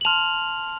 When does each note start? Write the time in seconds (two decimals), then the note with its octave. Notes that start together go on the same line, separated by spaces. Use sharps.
0.01 F#7
0.05 A5 C6 F6 F7